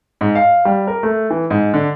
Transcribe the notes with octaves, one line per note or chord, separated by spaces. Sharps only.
G#2
F5
G3
A#4
A3
E3
G#2
D3